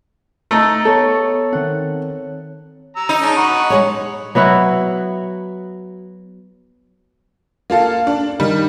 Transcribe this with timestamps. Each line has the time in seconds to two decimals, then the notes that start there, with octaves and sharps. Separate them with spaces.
0.51 A3 D#4
0.85 B3 A4 C#5
1.53 D#3 C4 F#5
2.96 A#5 E6
3.09 D#4
3.22 G#3 C#4 D4
3.36 F#5 B5 C#6
3.70 G#3 G#4 C#5
4.35 F#3 B3 E4 F#4
7.70 A#3 F4 A4 F5
8.07 D4
8.40 D#3 G3 D#4